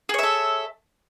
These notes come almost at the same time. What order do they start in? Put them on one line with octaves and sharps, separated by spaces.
G#4 C#5 E5 A4